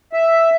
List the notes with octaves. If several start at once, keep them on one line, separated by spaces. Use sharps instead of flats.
E5